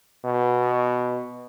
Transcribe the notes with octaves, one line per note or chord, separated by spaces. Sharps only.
B2